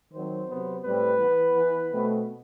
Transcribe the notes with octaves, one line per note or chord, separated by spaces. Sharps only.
D#3 F#3 C4 C5
C3 F#3 B3
A2 G3 C4 B4
E3 B3
E3 B3
B2 A3 C4